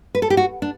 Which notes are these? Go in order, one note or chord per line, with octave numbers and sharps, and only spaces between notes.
B4
A4
G4
F#4
D4